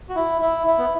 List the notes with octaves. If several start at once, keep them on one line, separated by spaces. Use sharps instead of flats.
F#4
E4
E4
E4
B3